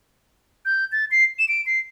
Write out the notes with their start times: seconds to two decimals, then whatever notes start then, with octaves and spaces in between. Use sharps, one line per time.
0.65 G6
0.92 A6
1.11 C7
1.39 E7
1.48 D7
1.66 C7